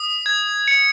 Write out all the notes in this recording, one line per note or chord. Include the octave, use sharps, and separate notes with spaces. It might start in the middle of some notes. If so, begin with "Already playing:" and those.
Already playing: D#6
G#6
C#7